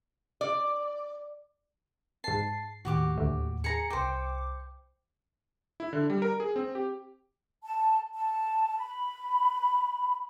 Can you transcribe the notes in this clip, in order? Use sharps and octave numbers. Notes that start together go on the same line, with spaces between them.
D5
G#2 A5 C7
D#2 A2 F#4 G4 D6
D2
G#4 A#5 C#7
C2 C5 G5 D6
E4
D3
G3
A#4
G#4
C4
G4
A5
A5
B5